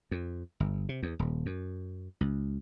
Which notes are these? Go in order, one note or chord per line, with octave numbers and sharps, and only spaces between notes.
F2
G1
C3
E2
D#1
F#2
C#2